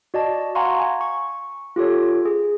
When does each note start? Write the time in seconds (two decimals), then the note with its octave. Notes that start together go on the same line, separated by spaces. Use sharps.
0.14 F#4 D5 D#5 A5
0.55 F5 F#5 G#5 A#5 C6 C#6
0.80 G#5
1.01 C#6
1.76 F4 G4 A4 C#5
2.25 G#4